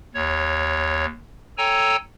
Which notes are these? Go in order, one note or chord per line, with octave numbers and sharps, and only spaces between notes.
D#2 C#5
A4 C#5 G5 G#5 A#5 E6